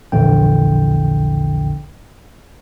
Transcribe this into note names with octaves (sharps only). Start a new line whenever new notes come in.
A#1 E2 D3 G5